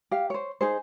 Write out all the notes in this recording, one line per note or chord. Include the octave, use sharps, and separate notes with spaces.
G4 F5
C5 C#5
D#4 G#4 C5